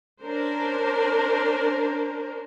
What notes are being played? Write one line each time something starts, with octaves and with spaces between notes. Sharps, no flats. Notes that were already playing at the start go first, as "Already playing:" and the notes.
C#4 D4 A#4 C5